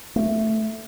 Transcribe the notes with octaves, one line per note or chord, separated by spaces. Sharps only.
A3